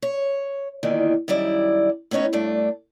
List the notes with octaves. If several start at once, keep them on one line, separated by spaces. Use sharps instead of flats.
C#5
E2 A#2 D3 D#3
F#2 D#3 G3 E4 D5
A2 B3 C#4 D#4 C#5
G2 A3 D4